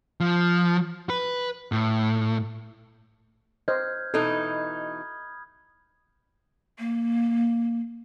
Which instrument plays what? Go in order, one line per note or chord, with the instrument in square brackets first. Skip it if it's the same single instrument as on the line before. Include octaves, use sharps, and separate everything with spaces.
[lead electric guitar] F3
B4
A2
[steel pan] C5 D#5 [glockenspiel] F6 G6 G#6
[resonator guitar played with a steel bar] B2 E3 D#4 [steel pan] A4 [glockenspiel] B5 D#6 G#6
[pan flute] A#3